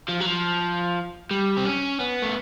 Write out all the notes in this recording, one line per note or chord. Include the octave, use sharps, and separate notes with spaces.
F3
F#3
F3
G3
C4
C#4
B3
A3